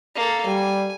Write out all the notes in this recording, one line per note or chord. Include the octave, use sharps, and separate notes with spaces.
A#3 A4
G3 G#5